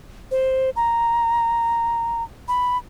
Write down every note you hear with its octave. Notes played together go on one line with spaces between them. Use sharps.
C5
A#5
B5